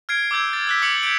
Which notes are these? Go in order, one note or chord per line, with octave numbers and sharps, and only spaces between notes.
F6 G#6 C7 D7
D6 E6 G6 G#6
A6
E6 F#6 B6
D6 C#7 F#7
G6 D7